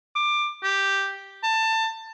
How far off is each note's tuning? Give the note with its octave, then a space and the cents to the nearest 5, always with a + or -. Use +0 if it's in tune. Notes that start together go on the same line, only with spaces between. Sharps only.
D6 +20
G4 +0
A5 +20